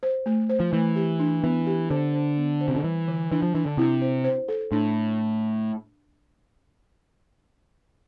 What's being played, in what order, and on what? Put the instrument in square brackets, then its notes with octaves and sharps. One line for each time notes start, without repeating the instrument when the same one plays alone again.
[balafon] C5
A3
C5
[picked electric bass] F3
[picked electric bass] E3 [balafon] A3
[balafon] G4
D4
[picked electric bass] E3 [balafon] B3
[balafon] G4
[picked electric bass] D3 [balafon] C5
[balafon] C5
B3
C5
[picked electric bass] C3
D3
[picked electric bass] E3 [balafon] G3
[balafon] D3
[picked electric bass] E3 [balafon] D4
[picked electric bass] F3
[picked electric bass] E3 [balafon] D4
[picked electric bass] D3
[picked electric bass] C3 [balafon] E4
[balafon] C5
C5
A4
[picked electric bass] A2 [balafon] D4